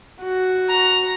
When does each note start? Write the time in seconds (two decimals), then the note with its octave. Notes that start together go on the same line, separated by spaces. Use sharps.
0.23 F#4
0.69 A#5